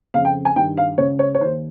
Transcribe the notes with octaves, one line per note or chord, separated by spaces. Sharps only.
F2 C#3 F5
G5
G#5
G2 D#3 G5
F5
C#2 C#3 C#5
C#5
C#5
D#3 C5
D#2